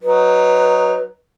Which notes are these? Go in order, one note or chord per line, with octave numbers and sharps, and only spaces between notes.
F#3 D#4 B4